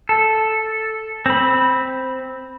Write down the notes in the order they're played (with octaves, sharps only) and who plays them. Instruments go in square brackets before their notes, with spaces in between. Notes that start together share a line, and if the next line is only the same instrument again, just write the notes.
[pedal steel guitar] A4
C4 B5